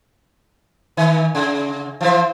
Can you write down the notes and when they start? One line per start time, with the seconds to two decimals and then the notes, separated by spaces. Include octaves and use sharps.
0.97 D#3
1.35 C#3
2.01 E3 F3 C5